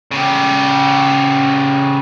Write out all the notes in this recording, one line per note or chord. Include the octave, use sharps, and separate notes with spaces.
C#3 G4